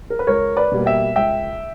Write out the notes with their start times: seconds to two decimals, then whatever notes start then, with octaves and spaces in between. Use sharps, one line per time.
0.10 A#4
0.19 B4
0.27 C#2 A#4 C#5
0.57 B4 D5
0.72 B2 G3 A#3
0.86 E5 G5
1.16 C#2 E5 G5